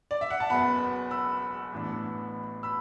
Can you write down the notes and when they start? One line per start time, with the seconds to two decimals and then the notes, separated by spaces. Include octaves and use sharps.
0.11 D5
0.21 E5
0.30 F#5
0.40 A5
0.50 F#1 E2 B2 B3 F#5 B5
1.11 B5 E6
1.72 A1 A2 E3 B3 D4
2.63 B5 E6